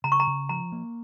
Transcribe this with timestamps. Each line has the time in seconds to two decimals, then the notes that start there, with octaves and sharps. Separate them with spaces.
0.04 C#3 A#5
0.12 C#6
0.20 A#5
0.27 C#3
0.49 F3 A#5
0.72 A#3